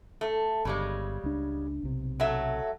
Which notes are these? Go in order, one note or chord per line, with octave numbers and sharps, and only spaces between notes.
A3
G1 C#3 G3 G#3
C#2 D4
B1 C3
F#3 A3 E5